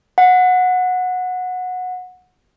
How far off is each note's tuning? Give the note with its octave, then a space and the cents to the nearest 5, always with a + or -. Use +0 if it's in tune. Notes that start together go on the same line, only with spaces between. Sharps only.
F#5 -15